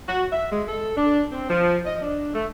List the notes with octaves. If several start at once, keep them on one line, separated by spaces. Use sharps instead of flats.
F#4
E5
G#3
A4
D4
C4
F3
D#5
D4
A3